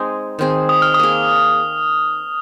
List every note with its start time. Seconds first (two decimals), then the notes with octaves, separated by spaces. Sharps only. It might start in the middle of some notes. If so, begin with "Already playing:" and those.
Already playing: G#3 C4 D#4 G#4
0.39 D#3 C4 G#4
0.69 D#6
0.82 F6
0.94 D#6
0.99 A#3 G#4